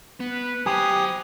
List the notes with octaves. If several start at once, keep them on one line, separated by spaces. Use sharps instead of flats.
B3 B4
F#3 G4 C5 G#5 D#6